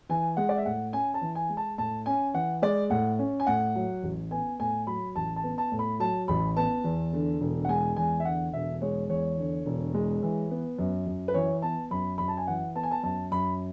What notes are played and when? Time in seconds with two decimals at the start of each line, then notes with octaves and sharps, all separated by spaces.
0.09 E3 G#5
0.37 G#3 F#5
0.49 D5
0.58 E5
0.65 A2 F#5
0.93 C#4 G#5
1.14 A5
1.21 E3
1.35 G#5
1.49 G#3
1.57 A5
1.78 A2 A5
2.06 C#4 G#5
2.34 E3 F#5
2.62 G#3 D5
2.90 A2 F#5
3.19 C#4
3.40 G#5
3.47 A2 F#5
3.76 F#3
4.03 A1
4.31 B3 G#5
4.60 A2 G#5
4.87 F#3 B5
5.16 A1 A5
5.36 A5
5.44 B3
5.58 A5
5.72 A2
5.79 B5
6.00 F#3 A5
6.28 A1 B5
6.57 B3 A5
6.84 E2
7.13 D3
7.41 E1
7.65 F#5
7.69 G#3 G#5
7.96 E2 G#5
8.20 E5
8.25 D3 F#5
8.53 E1 E5
8.82 G#3 C#5
9.09 E2 C#5
9.38 D3
9.66 E1
9.94 G#3
10.23 E3
10.51 B3
10.78 F#2
11.06 F#2
11.28 B4
11.34 E3 C#5
11.62 B3 A5
11.91 F#2 B5
12.18 F#2 B5
12.28 A5
12.37 G#5
12.47 E3 F#5
12.75 B3 A5
12.83 G#5
12.91 A5
13.03 F#2 A5
13.31 F#2 B5